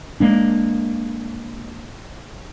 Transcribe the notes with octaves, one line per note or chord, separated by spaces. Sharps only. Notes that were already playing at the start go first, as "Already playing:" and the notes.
G#3 A#3 D4